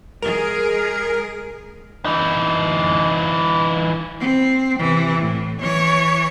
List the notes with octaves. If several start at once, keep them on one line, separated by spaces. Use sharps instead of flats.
G#3 G#4 A#4
E3 D#4
C4
C3 E3
A2
E3 C#5